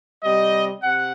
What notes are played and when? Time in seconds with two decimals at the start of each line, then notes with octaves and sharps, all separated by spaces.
0.24 C3 G3 D#5
0.83 C3 F#5